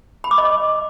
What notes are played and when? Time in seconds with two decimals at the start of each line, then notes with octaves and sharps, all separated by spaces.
0.24 B5
0.31 D6
0.38 D#5